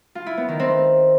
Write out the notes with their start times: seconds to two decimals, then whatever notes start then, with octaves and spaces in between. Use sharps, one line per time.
0.15 F4
0.26 E4
0.37 B3
0.48 D#3
0.60 C4